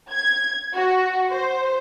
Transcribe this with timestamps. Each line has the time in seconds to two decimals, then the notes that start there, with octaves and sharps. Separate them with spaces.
0.12 G#6
0.76 F#4
1.31 C5